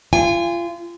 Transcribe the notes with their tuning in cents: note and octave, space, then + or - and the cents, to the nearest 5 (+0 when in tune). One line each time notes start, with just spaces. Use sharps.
F4 -30 G#5 -30